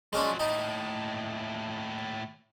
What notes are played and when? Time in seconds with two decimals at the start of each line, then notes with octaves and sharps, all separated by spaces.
0.13 F3 F#3 G#3 C#4 D4
0.39 D#2 A2 D#4